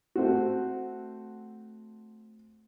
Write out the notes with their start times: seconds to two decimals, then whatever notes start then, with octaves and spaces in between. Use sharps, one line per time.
0.15 A3 C4 F#4